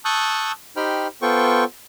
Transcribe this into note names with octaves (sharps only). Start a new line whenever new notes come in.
A5 C#6 D#6 E6 F#6 G6
D#4 G4 C5 G5 B5 F6
B3 F4 A4 C5 G5 C#6